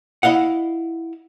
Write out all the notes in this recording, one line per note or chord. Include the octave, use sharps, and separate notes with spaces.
E4 D#5 F5 F#5